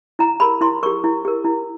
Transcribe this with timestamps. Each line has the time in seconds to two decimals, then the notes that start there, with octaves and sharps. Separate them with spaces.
0.19 E4 A#5
0.40 G4 A#4 B5
0.61 E4 C6
0.83 G4 A#4 C#6
1.04 E4
1.25 G4 A#4
1.45 E4